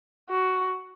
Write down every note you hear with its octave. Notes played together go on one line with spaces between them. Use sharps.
F#4